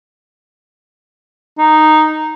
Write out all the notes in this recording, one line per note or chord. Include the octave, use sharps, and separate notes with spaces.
D#4